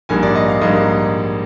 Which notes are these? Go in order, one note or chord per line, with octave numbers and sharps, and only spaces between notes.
A#1 G#2 G3 A#3 G#5
D5
D#5
F5
A#1 G#2 G3 A#3 D#5